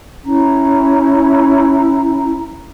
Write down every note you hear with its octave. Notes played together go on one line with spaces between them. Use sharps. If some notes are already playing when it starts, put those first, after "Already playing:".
C#4 E4 A#5